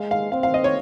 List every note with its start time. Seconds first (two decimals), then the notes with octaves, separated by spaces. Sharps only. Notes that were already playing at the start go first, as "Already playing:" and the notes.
Already playing: G#3 F5
0.11 F5
0.32 C4 F5
0.43 F5
0.54 D#5
0.64 C#5